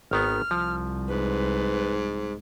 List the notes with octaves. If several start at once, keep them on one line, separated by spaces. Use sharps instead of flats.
G#1 D#3 B3 F6
C2 F3
G#2 B4